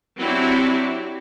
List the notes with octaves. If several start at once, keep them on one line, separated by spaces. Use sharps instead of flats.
F#3 C4 D4 E4 F#4 G4